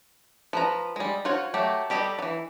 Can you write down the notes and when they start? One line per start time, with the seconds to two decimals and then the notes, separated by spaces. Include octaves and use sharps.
0.53 F3 B4 A#5
0.96 G3 G#3
1.25 F4 F#4 C5 C#5
1.54 F#3 A3 G4
1.90 G3 G4 A4 D#5
2.19 E3 F#3